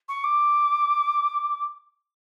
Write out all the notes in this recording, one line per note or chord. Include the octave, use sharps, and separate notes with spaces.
C#6
D6